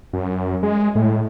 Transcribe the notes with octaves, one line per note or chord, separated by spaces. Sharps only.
F#2
G#3
A2